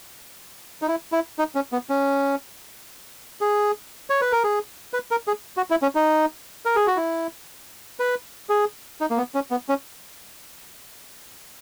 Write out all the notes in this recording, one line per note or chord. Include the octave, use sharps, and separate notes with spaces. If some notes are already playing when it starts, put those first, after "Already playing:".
D#4
E4
E4
D#4
C#4
B3
C#4
G#4
C#5
B4
A#4
G#4
B4
A#4
G#4
F#4
E4
C#4
D#4
A#4
G#4
F#4
E4
B4
G#4
D#4
A#3
B3
C#4
B3
C#4